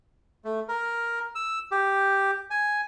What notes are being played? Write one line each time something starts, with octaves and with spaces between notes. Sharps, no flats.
A3
A#4
E6
G4
G#5